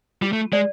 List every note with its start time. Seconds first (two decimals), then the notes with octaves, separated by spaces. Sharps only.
0.22 G3 F4
0.33 A3
0.53 G#3 D5